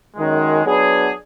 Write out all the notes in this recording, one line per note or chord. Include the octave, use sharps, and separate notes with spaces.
F#2 D#3 G#3
F#3 B3 D4 G#4 B4